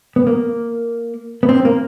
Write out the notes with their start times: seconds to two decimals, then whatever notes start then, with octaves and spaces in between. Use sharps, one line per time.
0.16 B3
0.27 A#3
1.43 B3
1.49 C4
1.65 A#3